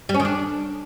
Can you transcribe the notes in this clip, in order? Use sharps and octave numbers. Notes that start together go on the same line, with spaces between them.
G3
C#4
D#3
D4